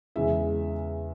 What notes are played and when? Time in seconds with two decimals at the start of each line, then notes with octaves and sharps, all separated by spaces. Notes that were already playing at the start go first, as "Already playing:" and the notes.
0.16 E2 C#3 E3 G#3 E5